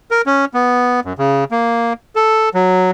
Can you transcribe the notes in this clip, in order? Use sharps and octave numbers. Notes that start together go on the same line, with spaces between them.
A#4
C#4
B3
F#2
C#3
A#3
A4
F#3